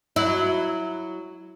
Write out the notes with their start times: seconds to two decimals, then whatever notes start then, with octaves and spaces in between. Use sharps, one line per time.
0.16 F#3 E4